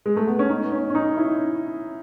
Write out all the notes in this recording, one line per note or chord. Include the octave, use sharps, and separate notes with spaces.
G#3
A3
B3
C#4
D#4
C#4
C#4
D#4
E4